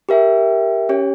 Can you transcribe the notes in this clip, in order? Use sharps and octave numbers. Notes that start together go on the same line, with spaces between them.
G4 A#4 E5 G5
C#4 G4 C#5